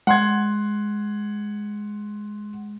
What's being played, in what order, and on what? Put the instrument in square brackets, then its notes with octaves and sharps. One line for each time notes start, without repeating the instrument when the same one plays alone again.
[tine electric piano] G#3 [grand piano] F#5 C6 G#6